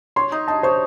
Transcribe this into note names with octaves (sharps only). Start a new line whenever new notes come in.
C#5 C6
D#4
D#4 A5
C5 C#5